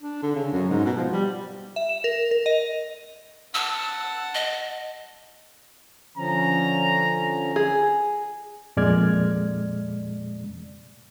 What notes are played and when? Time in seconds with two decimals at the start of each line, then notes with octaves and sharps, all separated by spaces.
0.02 D4
0.23 D3
0.35 C#3
0.53 F#2
0.69 G#2
0.85 B2
0.98 F3
1.12 G3
1.76 E5
1.89 E7
2.04 A#4
2.31 A#4
2.46 D#5
3.54 F#5 A5 E6
4.35 D#5
6.17 D3 F3 C#4 A#5
7.56 G#4
8.77 F2 A#2 G#3 D5 F6 G#6